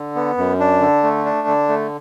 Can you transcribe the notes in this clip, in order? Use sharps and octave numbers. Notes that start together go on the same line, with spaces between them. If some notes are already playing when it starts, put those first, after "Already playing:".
Already playing: D3
B3
F#2
D4
D3
A3
D4
D3
A3